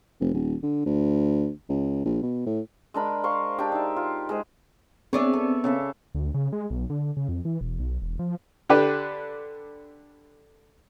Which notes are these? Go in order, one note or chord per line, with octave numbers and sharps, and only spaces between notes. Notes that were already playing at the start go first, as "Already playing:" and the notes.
F1
D#1
D3
D2
C#2
A#1
B2
A2
G#3 D4 A#4 B5
C5 F5 C6 C#6
D4 G4
D#4 E5
F4
G#3 G#4 C5
B3 C4 D4 G#4 C#5 D5 E5
A4
C#3 A4 E5
D2
C#3
G#3
B1
D3
C#3
F2
E3
E1
B1
E1
F3
D3 D4 G4 B4